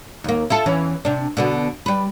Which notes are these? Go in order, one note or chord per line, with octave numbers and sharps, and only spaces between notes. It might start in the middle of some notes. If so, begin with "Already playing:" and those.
D#2 A#3
E4 F4 A4
E2 E3 C#4
C3 D4
B2 D3 B3
G3 B4